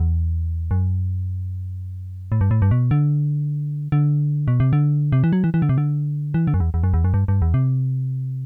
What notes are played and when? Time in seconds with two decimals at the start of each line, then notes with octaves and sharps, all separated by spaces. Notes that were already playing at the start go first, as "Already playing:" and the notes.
Already playing: E2
0.71 F#2
2.32 A2
2.41 G2
2.51 A2
2.62 G2
2.71 B2
2.91 D3
3.92 D3
4.48 B2
4.60 C3
4.73 D3
5.12 C3
5.24 E3
5.33 F#3
5.44 E3
5.54 E3
5.62 D3
5.69 C3
5.78 D3
6.34 E3
6.47 D3
6.54 F#2
6.60 E2
6.74 E2
6.84 F#2
6.94 E2
7.04 F#2
7.14 G2
7.28 G2
7.42 E2
7.54 C3